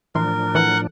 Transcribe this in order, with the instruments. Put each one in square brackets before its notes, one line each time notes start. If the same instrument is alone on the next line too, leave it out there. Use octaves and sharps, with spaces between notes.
[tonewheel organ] A2 F3 D4 [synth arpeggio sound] E3 C6 [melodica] A#4
[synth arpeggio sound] E3 A4 B4 [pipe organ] F#5